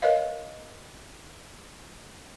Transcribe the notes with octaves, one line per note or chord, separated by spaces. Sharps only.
A#4 B4 C#5 D#5 F5